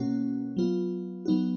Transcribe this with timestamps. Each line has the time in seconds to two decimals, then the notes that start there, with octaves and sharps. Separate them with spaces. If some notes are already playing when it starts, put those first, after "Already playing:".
Already playing: B2 A#3 C#4 F#4
0.57 F#3 B3 F4
1.25 F#3 B3 D#4 F#4